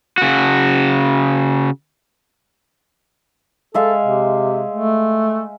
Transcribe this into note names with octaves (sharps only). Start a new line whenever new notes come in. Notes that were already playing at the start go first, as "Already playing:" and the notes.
C#3 F#4
G#3 A4 E5 F5
C3
A3